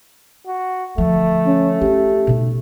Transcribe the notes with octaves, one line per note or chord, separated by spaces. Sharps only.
F#4
D3 F3 A3
C#4
C#4 F4 G4
B2 D#4